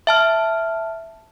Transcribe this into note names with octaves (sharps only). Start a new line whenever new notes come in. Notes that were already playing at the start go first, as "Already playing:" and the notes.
E5 A5 F6